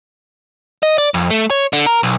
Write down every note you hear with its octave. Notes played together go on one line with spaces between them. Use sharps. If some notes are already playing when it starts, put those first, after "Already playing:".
D#5
D5
F2
A3
C#5
D3
A#4
B1